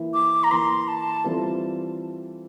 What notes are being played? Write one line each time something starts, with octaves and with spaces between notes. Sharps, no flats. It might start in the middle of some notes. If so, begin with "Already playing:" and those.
Already playing: E3 A#3 E4
D6
A#5
E3 A#3 E4 C6
A5
E3 G3 C4 F4 A4